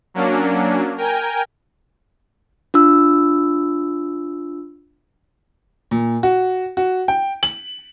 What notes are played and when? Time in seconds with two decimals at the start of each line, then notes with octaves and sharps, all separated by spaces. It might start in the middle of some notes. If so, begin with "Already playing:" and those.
0.14 F#3 A#3 C#4 D4
0.97 A#4 G5 G#5
2.74 D4 F4 E6
5.91 A#2
6.23 F#4
6.77 F#4
7.08 G5
7.43 F#7